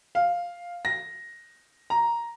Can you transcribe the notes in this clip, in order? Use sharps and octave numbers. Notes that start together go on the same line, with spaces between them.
F5
A#6
A#5